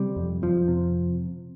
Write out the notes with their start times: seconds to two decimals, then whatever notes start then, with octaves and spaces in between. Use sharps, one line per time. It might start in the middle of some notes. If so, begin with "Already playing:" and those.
Already playing: C3 G3
0.16 F2
0.42 F2 F3
0.68 C3